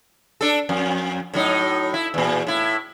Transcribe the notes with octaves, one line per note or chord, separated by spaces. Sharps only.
D4 A4
F2
A2 F#3 D#4
E4
E2 A#2
A2 E4